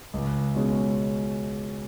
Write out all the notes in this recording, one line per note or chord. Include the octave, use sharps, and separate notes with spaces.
C#2
B2 G#3 C#4